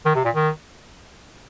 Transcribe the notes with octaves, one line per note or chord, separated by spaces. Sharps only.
D#3
C3
A#2
D#3